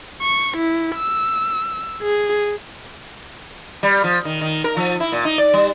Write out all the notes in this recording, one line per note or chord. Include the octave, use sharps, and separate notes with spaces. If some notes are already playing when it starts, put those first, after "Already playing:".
C#6
E4
E6
G#4
G3
F3
D#3
D#3
A#4
F3
E4
A#2
D#4
D5
G3